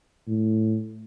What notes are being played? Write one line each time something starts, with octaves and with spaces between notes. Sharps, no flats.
A2